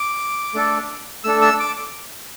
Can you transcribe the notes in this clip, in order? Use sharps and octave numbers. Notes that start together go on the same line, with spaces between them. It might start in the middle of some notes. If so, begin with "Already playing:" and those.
Already playing: D6
A3 D4 A4
A3 D4 A4 E6
E6
D6